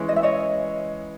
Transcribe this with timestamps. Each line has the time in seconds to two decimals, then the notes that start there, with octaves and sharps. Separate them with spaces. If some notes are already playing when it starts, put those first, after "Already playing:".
Already playing: E3 G#3 C#4 E4
0.09 D#5
0.16 E5
0.23 C#5 D#5